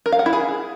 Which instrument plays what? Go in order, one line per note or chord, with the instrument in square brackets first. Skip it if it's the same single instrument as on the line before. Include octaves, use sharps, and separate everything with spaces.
[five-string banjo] A#4
F5
F#5
E4
G#4